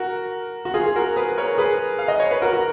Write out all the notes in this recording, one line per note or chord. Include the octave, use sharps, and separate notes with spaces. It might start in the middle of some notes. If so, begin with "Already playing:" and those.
Already playing: F#4 A#4
F#4
F4 G#4
G#4
F#4 A#4
G#4 B4
A#4 C#5
G#4 B4
F5
D#5
C#5
B4
F#4 A#4
F#4